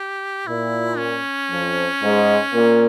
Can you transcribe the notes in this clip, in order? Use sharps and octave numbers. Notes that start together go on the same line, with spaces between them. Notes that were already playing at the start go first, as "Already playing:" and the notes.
Already playing: G4
A#2 E4
C#4
F2 F3
G#2 G#3
A#2 A#3